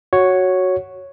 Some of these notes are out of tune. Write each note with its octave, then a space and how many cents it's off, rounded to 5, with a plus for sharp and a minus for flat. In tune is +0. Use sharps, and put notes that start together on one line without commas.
F#4 +0 C#5 +0